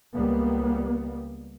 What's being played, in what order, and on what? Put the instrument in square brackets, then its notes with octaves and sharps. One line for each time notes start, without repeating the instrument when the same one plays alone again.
[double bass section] C#2 G3 A#3 B3